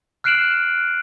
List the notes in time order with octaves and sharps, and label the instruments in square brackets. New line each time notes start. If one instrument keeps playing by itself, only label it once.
[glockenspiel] F6 F#6 C7 D7 E7 F#7